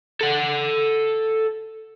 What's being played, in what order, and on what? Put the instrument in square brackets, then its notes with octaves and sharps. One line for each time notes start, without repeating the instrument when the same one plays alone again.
[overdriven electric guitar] A4 F#5